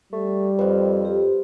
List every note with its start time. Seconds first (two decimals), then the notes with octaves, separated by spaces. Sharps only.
0.13 G3 A3
0.59 F2 B4 C5
1.05 G4